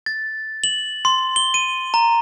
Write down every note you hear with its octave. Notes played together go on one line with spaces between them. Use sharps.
A6
F#7
C6
G7
D#7
A#5